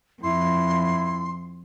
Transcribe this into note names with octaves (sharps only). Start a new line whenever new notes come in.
F2 E4 C6